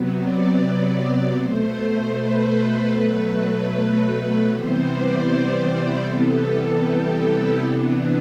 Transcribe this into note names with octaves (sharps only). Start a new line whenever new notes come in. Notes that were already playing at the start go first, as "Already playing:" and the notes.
Already playing: C3 F#3 B3
D5
B2 A3 C5
B4
B2 F#3 A3
C3 E3 G3 B3 C5
D5
D5
C5
C3 E3 G3 B3 A4
G4
E4
C3 E3 B3 D4